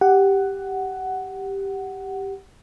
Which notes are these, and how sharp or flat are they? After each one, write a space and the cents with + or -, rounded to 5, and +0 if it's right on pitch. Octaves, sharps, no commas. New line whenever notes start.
G4 +0 F#5 +10